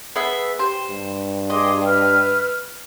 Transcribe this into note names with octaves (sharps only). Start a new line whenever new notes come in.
B3 G#4 E5
G4 C5
G2
G#4 D#5 C6 D6
B4 E6 F6